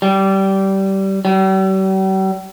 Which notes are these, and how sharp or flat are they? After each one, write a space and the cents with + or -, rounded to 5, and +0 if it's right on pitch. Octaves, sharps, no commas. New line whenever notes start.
G3 -20
G3 -45